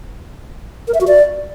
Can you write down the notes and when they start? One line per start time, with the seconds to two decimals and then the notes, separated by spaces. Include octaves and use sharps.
0.88 A#4
0.94 E5
1.01 F#4
1.07 D5